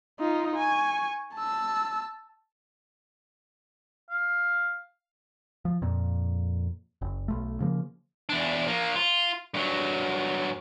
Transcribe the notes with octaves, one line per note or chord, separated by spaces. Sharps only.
D#4 F4
G#5 C#6
A5 E6
F5
F3
F2 A#2
F#1
B1 A3
C#3 F3 F#3 A#3
E2 D4
F3 A#3
F4
G2 F#3